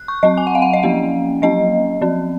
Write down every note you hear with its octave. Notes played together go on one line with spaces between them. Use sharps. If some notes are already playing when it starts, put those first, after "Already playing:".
Already playing: F#6
C#6
F#3 C4 D#5
G#5
F#5
F5
F#5
D#5
F3 A#3 C#4 F5
F#3 A#3 C#4 D#5
F3 C4